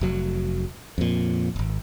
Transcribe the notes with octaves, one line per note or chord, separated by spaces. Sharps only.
F1 F#3
F2 A#2
D#1 G#1